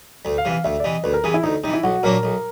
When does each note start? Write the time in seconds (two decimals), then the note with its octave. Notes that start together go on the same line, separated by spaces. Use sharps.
0.25 D2
0.38 F5
0.45 C3 E3
0.51 F5
0.64 D2 E5
0.80 D5
0.84 C3 E3 D#5
1.04 D2 B4
1.13 A#4
1.24 C3 E3 G#4
1.34 E4
1.43 D2 D#4
1.64 C3 D#4
1.68 E3
1.73 E4
1.83 B1 F#4
2.03 A#2 F#3 A#3 D4 A#4
2.23 B1